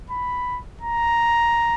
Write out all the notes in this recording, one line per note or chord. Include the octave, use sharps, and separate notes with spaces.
B5
A#5